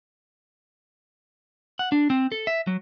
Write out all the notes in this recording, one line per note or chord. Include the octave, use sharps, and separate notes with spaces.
F#5
D4
C4
A4
E5
F#3